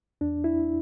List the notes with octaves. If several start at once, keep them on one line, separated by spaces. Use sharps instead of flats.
E2 D4
E4